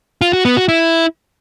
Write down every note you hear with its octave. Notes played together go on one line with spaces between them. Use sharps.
F4
F#4
B3
F#4
E4